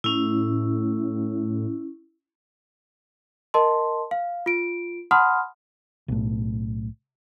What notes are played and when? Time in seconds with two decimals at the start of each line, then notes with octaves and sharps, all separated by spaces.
0.04 A2 C#4 E4
3.54 A#4 D#5 A5 C6
4.11 F5
4.46 F4 D7
5.11 F#5 A5 B5 C6 D#6 F6
6.08 B1 A2